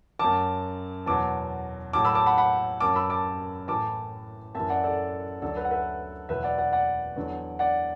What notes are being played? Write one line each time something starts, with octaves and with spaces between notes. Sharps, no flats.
F#2 F#3 A5 D6
E2 B2 F#3 A5 D6
A2 F#3 A5 D6
B5 E6
A5 D6
F#5 B5
F#5 B5
F#2 F#3 A5 D6
B5 E6
A5 D6
A2 E3 A5 D6
F#2 E3 E5 A5
D5 F#5
A4 D5
D2 D3 F#3 A4 D5
B4
F#5
B4 E5
E2 B2 F#3 B4 E5
D5 F#5
D5 F#5
D5 F#5
E2 D3 F#3
D5 F#5